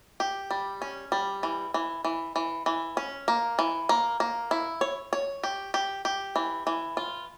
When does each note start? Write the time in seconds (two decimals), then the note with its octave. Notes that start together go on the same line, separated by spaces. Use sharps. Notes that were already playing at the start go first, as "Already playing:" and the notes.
0.20 G4
0.51 G3
0.82 C#4
1.12 G3
1.43 E3
1.74 E3
2.04 E3
2.36 E3
2.66 E3
2.97 C#4
3.28 A#3
3.59 E3
3.89 A#3
4.20 A#3
4.51 E4
4.81 C#5
5.13 C#5
5.43 G4
5.74 G4
6.05 G4
6.36 E3
6.67 E3
6.97 F4